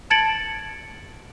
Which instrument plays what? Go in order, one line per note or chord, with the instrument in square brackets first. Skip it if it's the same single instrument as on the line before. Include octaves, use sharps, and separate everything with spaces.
[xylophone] A5 G#6 A6 C#7 D7 F#7